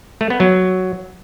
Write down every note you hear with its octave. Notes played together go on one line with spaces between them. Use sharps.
A3
B3
F#3